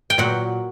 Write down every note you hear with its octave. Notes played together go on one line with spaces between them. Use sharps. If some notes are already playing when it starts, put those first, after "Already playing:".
G5
A#2 F#3 F#5